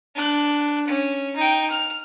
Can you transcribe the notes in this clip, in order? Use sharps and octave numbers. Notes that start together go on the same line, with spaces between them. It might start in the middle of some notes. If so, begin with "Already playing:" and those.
D4 F#6
C#4
D#4 G5
F6